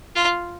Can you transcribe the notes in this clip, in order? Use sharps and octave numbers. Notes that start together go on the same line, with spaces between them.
F4